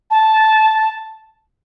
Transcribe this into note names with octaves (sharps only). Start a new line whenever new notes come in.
A5